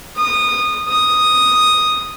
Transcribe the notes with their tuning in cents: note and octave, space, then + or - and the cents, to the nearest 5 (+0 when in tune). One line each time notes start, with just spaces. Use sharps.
D#6 -20
D#6 +0